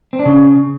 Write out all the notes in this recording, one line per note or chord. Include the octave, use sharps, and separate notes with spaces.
C4
D4
C#3